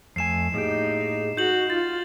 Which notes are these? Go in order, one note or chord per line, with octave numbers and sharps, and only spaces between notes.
F2 A3 G#5 C7 E7
A2 A#3 D#4 G4 G#4
D#4 F#4 G6 F#7
F4 A6